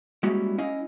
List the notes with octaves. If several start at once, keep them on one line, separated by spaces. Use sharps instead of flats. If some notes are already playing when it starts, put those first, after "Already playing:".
G3 G#3 A#3 C#4 E4 F#4
C#4 E4 D#5 F5